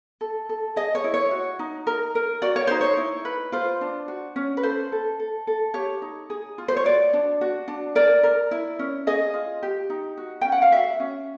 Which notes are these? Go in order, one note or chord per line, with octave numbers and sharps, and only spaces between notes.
A4
A4
G#4 D#5
C#5
E4
C#5
F#4
D#4
A#4
A#4
F#4 D5
C#5
D#4 C5
C#5
E4
B4
F4 C5
D4
F#4
C#4
B4
A4 C5
A4
A4
A4
G4 C#5
D#4
G#4
F4
C5
C#5
F#4 D5
D4
F#4
D4
A#4 D5
A#4
E4
C#4
G#4 D#5
F4
G4
D#4
F#4
C#4 G5
F#5
F5
F#4 E5
C#4